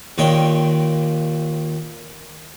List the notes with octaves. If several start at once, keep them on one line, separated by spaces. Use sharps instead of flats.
D#2 A#2 D#3 C#5 G5